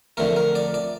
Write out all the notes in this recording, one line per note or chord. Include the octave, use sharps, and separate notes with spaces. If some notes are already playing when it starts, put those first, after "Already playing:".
F2 D3 A3 A#4
A#4
D5
D5